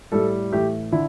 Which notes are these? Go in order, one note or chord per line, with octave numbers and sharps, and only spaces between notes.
A2 G3 A4
A2 E3 A3 G4
D3 E4